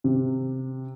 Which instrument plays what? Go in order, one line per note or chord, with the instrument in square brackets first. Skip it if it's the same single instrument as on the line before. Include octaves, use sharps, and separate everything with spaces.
[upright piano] C3